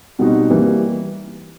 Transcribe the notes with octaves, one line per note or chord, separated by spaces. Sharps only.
B2 G3 C4 D#4 F#4
E3 G3 A#3